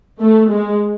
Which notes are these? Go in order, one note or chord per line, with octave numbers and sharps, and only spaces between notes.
A3
G#3